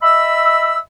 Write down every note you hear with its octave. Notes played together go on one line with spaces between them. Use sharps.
D#5 E5 B5 E6